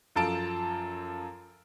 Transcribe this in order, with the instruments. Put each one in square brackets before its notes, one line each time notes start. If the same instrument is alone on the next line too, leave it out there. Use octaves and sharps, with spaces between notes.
[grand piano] F#2 F3 A4 F5 A5 D7